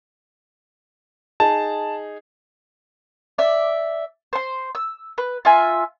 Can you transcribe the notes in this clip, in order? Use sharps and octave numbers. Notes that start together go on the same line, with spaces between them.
D#4 G#4 A5
D5 E5
C5 C6
E6
B4
F4 E5 G#5